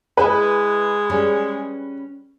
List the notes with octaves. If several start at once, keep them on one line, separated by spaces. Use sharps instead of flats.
G#3 E4 G#4 B4 D#5
G3 C#4 G#4